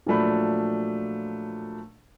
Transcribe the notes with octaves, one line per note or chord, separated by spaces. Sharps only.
A#2 F3 F#3 A3 D4 B5